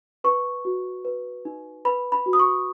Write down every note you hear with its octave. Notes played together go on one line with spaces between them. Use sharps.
B4 C#6
F#4
B4
D#4
B4 B5
B5
F#4
D#6
C#6